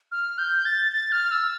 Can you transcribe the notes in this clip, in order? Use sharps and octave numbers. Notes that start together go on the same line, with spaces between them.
F6
G6
A6
A6
F6
E6